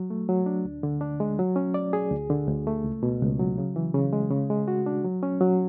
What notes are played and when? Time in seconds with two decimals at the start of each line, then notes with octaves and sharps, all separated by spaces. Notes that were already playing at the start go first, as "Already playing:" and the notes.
Already playing: F#3
0.10 A3
0.29 F#3
0.46 D4
0.65 D2
0.83 D3
1.01 D4
1.20 G#3
1.39 F#3
1.56 C#4
1.74 D5
1.93 G#4
2.11 D2
2.30 D3
2.48 D2
2.67 A3
2.84 C#2
3.03 B2
3.22 C#2
3.39 F#3
3.58 C#3
3.76 E3
3.94 C#3
4.13 G#3
4.30 C#3
4.50 G#3
4.68 F#4
4.86 D4
5.04 F#3
5.23 C#4
5.41 F#3